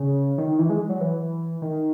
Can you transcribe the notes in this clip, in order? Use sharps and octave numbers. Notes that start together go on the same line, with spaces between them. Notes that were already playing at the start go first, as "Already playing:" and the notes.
Already playing: C#3
D#3
D#3
E3
G#3
F#3
E3
D#3